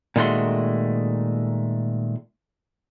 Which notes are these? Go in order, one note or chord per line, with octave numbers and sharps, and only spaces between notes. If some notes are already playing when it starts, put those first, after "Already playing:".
A#2 D#3 G#3 A3 F#4 C6